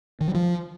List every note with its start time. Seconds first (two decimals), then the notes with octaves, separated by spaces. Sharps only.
0.21 D#3
0.28 F#3
0.35 F3